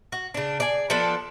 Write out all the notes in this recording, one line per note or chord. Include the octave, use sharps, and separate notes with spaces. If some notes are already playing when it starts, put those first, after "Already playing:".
F#4
C#3 D4
G#4 D5
F3 B3 D4 A4